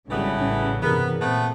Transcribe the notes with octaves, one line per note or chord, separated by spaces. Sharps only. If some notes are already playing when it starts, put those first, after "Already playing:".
G#1 C#3 E3 G3 A3 B3
A1 C#4
G2 C3 E3 B3 G#4 A#4
A#2 A3 B3 C4